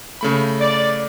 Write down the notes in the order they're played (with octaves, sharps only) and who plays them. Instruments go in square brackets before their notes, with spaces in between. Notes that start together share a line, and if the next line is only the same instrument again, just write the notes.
[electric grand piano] C#3 A3 B5
[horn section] D5